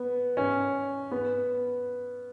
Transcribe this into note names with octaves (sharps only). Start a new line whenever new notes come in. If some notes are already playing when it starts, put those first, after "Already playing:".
Already playing: B3
C#4
B3